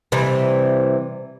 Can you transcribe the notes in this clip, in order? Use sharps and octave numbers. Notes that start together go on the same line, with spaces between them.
C3 E3 G3